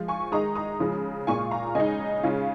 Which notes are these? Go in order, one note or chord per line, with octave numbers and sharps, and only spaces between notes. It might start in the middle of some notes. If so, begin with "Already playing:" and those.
Already playing: F3 G#3 F4
G#5 C#6
D#3 G#3 D#4 A#5 D#6
A#5 D#6
C#3 F3 G#3
A#2 G#3 F4 G#5 C#6
F5 A#5
C#3 G#3 D#4 D#5 G#5
C#3 G#3 C#4 F4